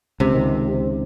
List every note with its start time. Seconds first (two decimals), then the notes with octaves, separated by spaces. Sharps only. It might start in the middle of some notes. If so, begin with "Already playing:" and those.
0.20 C#2 C3
0.33 C#2 D#3